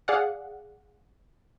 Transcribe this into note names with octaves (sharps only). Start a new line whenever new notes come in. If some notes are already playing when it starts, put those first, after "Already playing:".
G#4 D5 F5 F#5